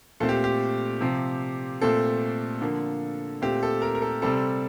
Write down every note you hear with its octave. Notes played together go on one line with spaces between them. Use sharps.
A#2 A3 C4 A4
G4
G4
C3 F3 C4
A#2 A3 C4 A4
D3 F3 A#3
A#2 A3 C4 G4
A4
A#4
A#4
A4
C3 G3 C4 A4